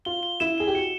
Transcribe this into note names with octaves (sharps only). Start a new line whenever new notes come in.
F4 G7
G7
E4 E7
G#4 E7
G4
F#4 C#7